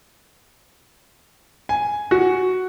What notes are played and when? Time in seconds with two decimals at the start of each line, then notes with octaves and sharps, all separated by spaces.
1.69 G#5
2.11 F#4